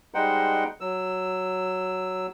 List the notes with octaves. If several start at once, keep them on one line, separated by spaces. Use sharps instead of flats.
G3 G#3 D#4 C5 F#5 G5
F#3 E6